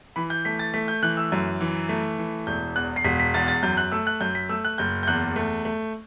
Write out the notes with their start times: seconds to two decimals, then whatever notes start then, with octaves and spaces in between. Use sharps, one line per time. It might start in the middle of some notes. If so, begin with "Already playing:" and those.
0.16 E3 B5
0.30 G6
0.45 A3 B6
0.59 A6
0.74 A3 B6
0.88 G6
1.03 E3 F#6
1.17 E6
1.32 F#2
1.61 E3
1.89 A3
2.18 E3
2.47 E1 G6
2.76 E2 F#6
2.96 C7
3.04 E1 B6
3.20 B6
3.34 E2 A6
3.48 A6
3.63 F#2 G6
3.77 F#6
3.92 A3 E6
4.07 F#6
4.21 F#2 G6
4.35 B6
4.49 A3 E6
4.65 F#6
4.78 F#1 G6
5.03 G6
5.07 E2 F#6
5.36 A3
5.65 A3